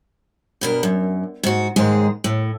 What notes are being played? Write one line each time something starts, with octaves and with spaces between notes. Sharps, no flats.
G2 B2 A#4
F#2
G#2 F#4
D#2 G#2 G#3 G#4
A2